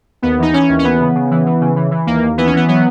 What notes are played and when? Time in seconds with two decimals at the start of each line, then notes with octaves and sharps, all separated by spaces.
0.22 D#2 B3
0.39 E3 D#4
0.53 E3 C#4
0.69 D#2
0.79 C#4
0.84 E3 B3
1.00 C#3
1.15 C#3
1.31 E3
1.46 E3
1.61 C#3
1.76 E3
1.91 E3
2.07 D#2 A#3
2.22 D#2
2.38 E3 B3
2.47 C#4
2.53 E3 B3
2.68 F#3 B3